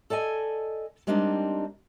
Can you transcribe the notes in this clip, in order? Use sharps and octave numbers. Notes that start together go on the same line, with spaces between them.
A4 D5 D#5 G#5
G3 G#3 A#3 C4 D4 D#4